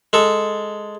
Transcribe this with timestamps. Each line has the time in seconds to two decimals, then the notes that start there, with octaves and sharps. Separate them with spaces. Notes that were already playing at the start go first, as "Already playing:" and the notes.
0.13 G#3 A4